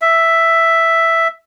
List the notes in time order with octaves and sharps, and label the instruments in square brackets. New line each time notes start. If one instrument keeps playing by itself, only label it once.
[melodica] E5